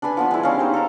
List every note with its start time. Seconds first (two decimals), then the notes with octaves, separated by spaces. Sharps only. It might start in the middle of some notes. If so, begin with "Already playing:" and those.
0.02 D4 A4 B4 G#5
0.17 F3 B3 D4
0.31 G#3 E4
0.43 G3 C#4 D#5 F5
0.59 D#4 G4 C5
0.74 A4 A#4 A#5